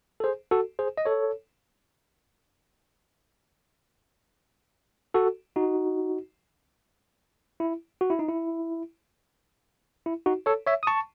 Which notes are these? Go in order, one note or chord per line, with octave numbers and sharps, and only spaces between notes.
A4
G#4 C5
F#4 A4
G#4 C5
D#5
A4 C#5
F#4 A4
D#4 F#4
E4
F#4
E4
D#4
E4
E4
D#4 F#4
A4 C#5
C#5 E5
D#6
A5 C#6